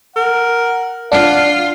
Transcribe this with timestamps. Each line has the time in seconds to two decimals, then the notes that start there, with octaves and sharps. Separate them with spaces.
0.16 A#4 F#5
1.12 D4 F4 F5 F#5